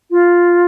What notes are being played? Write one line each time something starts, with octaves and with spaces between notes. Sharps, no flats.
F4